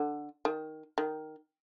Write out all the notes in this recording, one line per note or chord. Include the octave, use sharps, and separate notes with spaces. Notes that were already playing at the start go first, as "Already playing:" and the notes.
Already playing: D3
D#3
D#3